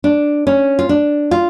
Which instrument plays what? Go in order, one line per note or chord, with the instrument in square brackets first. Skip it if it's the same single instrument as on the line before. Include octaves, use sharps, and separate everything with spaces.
[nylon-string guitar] D4
C#4
F4
D4
F4